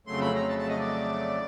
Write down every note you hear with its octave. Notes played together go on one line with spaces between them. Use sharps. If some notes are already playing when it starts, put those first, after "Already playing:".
F2 C#3 F#3 A3 C6
B5
A#5
A5
A5
D#5
D5